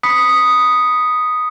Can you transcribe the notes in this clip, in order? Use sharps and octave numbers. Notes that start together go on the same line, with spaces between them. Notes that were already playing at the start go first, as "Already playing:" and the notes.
B5 D#6 B6 C#7